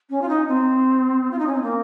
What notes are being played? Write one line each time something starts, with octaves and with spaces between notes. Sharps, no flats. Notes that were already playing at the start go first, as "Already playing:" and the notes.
C#4
F4
D#4
C4
F4
D#4
C#4
C4
A#3